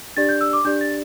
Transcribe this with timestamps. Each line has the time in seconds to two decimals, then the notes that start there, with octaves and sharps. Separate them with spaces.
0.17 D4 G4 D5 A6
0.29 G6
0.41 E6
0.53 D6
0.64 D4 G4 D5 G6
0.81 A6